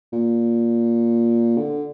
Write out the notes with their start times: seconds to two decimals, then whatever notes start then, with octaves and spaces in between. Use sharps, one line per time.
0.13 A#2
1.57 D3